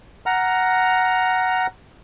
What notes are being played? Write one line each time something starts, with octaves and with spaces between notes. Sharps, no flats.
F#5 A#5 F6